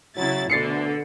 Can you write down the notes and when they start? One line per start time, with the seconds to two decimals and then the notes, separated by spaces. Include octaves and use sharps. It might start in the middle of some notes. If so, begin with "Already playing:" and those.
0.17 C#3 F#3 E4 A6
0.50 D2 B2 D3 A6 C7 C#7